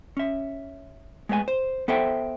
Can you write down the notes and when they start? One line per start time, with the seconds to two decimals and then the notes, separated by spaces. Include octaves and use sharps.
0.17 C#4 E5
1.29 G#3 A3 B3 E5 G#5
1.48 C5
1.88 B3 A4 C5 E5 G5